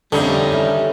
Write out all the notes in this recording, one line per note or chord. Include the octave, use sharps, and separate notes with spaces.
F2 D3 G3 A3 C4 C#4 D#4
D#3 E3